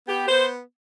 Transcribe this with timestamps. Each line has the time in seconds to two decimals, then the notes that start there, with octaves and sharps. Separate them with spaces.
0.08 B3 G4
0.28 B3 C5